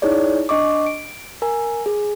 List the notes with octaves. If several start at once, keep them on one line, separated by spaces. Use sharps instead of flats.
D#4 E4 G#4 C#5 D5
D4 D#5 C#6 D6
D7
A#4 G#5
G#4